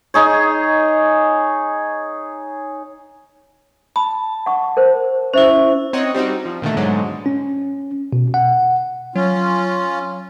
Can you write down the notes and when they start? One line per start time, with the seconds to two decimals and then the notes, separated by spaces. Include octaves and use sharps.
0.14 D#4 G#4 C#5
3.96 A5 B5
4.46 F#5 C#6
4.77 A#4 C5
5.34 C#4 E4 C5 E5
5.93 C4 D#4 C#5 D#5 F#5
6.14 G3 C4 D#4 F#4
6.45 F3
6.62 A#2 D3 D#3 A3
6.77 G#2 B2 D3 F#3 G#3
7.26 C#4
8.13 B2
8.34 F#5
9.16 F#3 C#4 F4